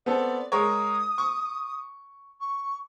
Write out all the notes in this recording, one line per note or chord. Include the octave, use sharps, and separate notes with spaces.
B3 C4 A4 D5
G#3 A#4 C#5 D#6
C#6
C#6